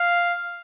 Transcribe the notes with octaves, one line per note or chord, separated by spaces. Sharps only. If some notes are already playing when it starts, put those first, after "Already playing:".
Already playing: F5